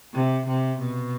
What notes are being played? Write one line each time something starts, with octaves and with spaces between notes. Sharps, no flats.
C3
C3
B2